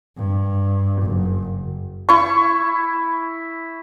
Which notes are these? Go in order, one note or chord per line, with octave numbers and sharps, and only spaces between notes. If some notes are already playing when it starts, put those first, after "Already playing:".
G2
F#1
E4 C#6